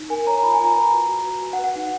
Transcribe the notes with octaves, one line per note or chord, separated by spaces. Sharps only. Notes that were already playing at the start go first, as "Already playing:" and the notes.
Already playing: D#4
A#4 G#5
C#5 A#5
F4 B5
G#5
F4 A#5
B4
F#4
F#4
B4
F#4
F#5
B4
F#5
D#4 F#5